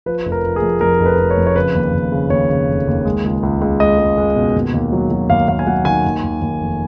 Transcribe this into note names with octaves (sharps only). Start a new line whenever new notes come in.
F3 B4
F1
A#4
F3
G#4
F2
F2 A#4
F1
B4
F1
C#5
F2
C#5
C#3 B4
D#2
D#2
C#3
D#2 C#5
C#3
F1
D#2
G#3
C#2
C#2
C#2
G#3 D#5
G#3
G#3
B2
D#2
D#2
F#3
F#3
D#2 F5
D#2 F5
G#5
F#3 F#5
D#3 G#5
D#2
D#2
D#2
F1